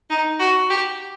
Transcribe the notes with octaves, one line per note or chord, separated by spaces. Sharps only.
D#4
F#4
G4